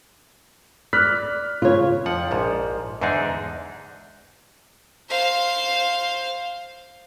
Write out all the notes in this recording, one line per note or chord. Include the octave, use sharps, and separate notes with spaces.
D5 F6 F#6 B6
C#3 F4 C#5
F2 F3 F#5
A#1 G#2 F3
E2 G#2 D3 D4 D#4 G#4
C5 F5